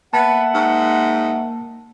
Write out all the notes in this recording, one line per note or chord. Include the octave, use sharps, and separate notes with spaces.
A#3 B3 E5 F#5 A5
G#2